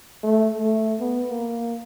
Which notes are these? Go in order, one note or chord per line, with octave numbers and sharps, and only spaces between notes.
A3
A3
B3
A#3